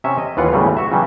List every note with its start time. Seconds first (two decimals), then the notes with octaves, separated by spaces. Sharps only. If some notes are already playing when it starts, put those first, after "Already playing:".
0.04 C3 C#4 E5
0.18 D#5
0.37 D#2 E3 F4 B4 F#5
0.52 E2 A2 C#3 F#3 G3
0.77 F#4 E5
0.92 C#3 E3 F#3 G3